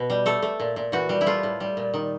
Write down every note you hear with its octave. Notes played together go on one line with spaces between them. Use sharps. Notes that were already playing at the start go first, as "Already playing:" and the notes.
Already playing: B2
G3
A3 A4
A3
A#2
A#2
E3 F#4
G3
E4
A3 F4
A2
G3
A#2
D#3